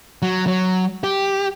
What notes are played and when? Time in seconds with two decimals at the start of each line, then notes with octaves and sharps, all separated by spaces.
0.22 F#3
0.47 F#3
1.04 G4